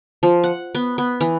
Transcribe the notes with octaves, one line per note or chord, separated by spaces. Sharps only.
F3
F#5
B3
B3
E3